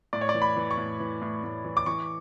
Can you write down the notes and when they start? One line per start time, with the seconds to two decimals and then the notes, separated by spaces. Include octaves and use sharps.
0.13 A2 D5
0.21 C#5
0.29 D5
0.34 E3
0.42 B5
0.57 E3
0.71 C#6
0.78 A2
1.00 E3
1.22 A2
1.44 A2
1.65 E3
1.77 D6
1.86 E3 C#6